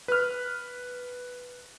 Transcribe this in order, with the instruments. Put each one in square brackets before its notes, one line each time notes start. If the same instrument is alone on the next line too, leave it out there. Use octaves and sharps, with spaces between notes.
[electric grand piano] B4 F6